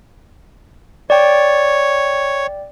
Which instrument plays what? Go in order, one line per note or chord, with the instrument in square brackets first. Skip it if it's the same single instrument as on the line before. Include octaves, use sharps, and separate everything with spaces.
[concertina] C#5 [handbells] D5 G5